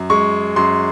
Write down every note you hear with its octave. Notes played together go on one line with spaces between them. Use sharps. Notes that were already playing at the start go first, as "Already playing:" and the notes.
Already playing: F#2
G#3 C#6
F#2 C6